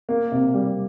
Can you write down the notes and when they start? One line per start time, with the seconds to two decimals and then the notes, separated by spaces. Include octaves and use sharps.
0.09 A#3
0.32 C3
0.54 G3